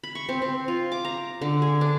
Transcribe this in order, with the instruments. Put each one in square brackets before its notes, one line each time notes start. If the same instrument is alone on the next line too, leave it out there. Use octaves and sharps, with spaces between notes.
[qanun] B5
C#6
C4
C4
F4
D6
A#5
D3
G#4
D4